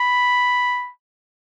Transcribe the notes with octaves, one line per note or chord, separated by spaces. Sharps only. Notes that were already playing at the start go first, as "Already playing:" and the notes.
Already playing: B5